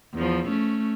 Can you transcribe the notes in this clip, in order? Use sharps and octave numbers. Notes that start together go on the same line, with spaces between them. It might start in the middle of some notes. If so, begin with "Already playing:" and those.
E2 F3
A3 C#4